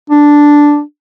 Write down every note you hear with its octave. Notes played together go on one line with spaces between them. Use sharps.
D4